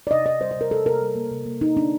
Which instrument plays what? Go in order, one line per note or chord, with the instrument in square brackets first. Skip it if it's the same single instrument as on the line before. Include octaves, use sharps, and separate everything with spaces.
[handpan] D5
C3 D#5
C3 D#5
G3 C5
C5
C3 A#4
C3 A4
C3 A#4
G3
A#3
C3
A#3
C3 D#4
C3 D4